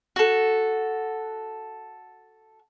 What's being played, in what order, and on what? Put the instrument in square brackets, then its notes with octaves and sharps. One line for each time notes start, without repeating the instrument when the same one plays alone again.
[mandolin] F#4 A4